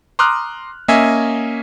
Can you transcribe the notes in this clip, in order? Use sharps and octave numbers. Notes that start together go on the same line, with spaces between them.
A#5 C6 D6 D#6 F6 F#6
A#3 C#4 D#5 E5 G#5